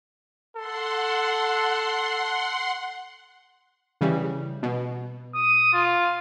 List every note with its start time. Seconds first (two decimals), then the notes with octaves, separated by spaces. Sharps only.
0.56 A4 F#5 C6
4.01 C#3 E3 G3
4.63 B2
5.35 D#6
5.73 F4